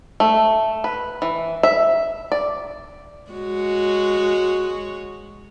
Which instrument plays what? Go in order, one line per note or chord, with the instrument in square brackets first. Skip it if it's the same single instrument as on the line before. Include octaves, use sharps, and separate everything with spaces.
[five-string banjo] A3
B4
E3
E5
D5
[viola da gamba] G#3 F#4 C#5